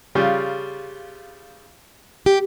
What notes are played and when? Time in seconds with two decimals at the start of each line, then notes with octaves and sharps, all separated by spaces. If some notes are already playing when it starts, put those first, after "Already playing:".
0.15 C#3 G3 F4
2.26 G4